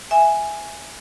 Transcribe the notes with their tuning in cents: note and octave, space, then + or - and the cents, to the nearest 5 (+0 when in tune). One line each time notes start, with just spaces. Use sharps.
E5 +0 G#5 +0